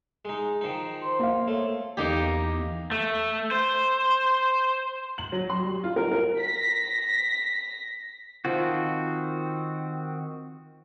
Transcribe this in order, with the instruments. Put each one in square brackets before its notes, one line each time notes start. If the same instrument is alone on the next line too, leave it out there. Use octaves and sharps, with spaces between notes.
[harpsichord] G#3 D#4
D#3 F3 D#4
[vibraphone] C5 C6
[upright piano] A#3 F5
[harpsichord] A3 [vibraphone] C#5
[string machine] E2 [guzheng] A#3 D#4 G4
[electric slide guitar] A3
C5
[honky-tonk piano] F#7
F#3
C6
G3
F4
A#4
A#4
[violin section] A#6 B6
[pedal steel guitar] D#3 C4 F#4 [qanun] F3